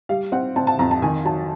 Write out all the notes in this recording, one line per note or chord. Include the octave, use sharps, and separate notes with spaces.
G3 F5
C4 F#5
C4 A5
A5
F2 A#5
A5
D#3 G#5
F#3 A5